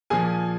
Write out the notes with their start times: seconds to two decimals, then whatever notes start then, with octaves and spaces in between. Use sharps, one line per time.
0.10 A#2 F3 G#4 G#5